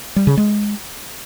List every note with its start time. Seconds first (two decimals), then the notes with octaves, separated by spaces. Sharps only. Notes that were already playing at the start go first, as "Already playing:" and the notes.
0.16 G3
0.27 C#3
0.37 G#3